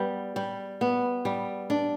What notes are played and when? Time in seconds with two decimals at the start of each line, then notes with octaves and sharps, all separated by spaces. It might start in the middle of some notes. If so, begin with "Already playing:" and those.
Already playing: G3 B3
0.36 G3
0.81 B3
1.25 G3
1.70 D4